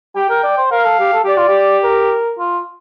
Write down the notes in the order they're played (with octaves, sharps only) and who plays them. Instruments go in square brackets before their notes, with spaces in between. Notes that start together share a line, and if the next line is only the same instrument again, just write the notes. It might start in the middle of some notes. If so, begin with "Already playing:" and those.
[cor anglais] G4 [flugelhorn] G5
[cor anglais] A#4
D5
C5
[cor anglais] A#4 [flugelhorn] F5
[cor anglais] A4
G4
A4
[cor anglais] G4 [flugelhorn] D5
[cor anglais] F4
G4
[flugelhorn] A#4
[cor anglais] F4